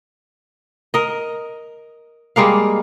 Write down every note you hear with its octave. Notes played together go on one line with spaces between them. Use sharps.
A#4 D#5
G3 G#3 A#3 F5